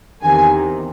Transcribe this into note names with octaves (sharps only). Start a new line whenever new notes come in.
E2 C3 D#3 G#5